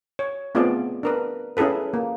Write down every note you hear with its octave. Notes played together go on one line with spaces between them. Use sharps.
C#5
A3 B3 C4 F4 G#4 D5
D4 A#4 B4
C#4 E4 G#4 A4 B4
A#3